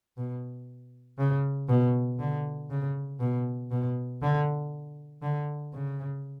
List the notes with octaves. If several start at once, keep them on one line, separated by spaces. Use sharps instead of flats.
B2
C#3
B2
D3
C#3
B2
B2
D3
D3
C#3